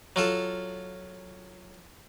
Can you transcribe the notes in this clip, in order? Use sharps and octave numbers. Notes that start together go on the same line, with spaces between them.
F#3 F4 A4